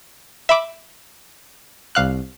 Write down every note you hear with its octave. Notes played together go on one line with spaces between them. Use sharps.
E5 B5 D6
C2 F5 F#6